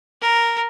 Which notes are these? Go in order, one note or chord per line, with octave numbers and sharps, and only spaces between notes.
A#4